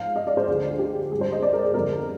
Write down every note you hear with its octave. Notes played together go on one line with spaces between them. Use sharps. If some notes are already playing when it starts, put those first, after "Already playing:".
Already playing: G#2 F3 F5
D#5
D5
C5
D2 D3 F3 G#4
G4
G#2 G3 G#4
C5
D#5
D5
A#4
G#4
F2 D3 G3 A#4